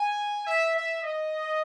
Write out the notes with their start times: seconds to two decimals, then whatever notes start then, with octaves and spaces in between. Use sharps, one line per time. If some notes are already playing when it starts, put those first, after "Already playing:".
Already playing: G#5
0.47 E5
0.75 E5
1.03 D#5